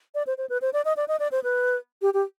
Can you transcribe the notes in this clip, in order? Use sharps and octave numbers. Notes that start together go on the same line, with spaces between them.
D5
C5
C5
B4
C5
D5
D#5
D5
D#5
D5
C5
B4
G4
G4